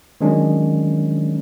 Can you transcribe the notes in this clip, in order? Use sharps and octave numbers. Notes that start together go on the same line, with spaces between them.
D#3 F#3 G#3 C#4 D4